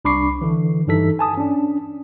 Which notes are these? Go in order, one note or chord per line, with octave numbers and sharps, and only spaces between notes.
C2 D4 B5 C#6 D6 C7
D3 E3
G2 E3 D#4 A4 B6
G#5 A5 D#6
C#4 D4